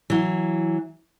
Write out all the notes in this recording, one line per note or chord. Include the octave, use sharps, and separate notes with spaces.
E3 F#3